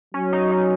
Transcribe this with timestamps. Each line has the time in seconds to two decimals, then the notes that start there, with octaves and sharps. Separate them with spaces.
0.14 F#3 C#4
0.33 D#4
0.51 D#4